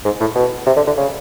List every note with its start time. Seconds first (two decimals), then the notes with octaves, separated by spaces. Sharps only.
0.05 G#2
0.20 A2
0.35 B2
0.66 C3
0.76 D3
0.87 D3
0.97 C#3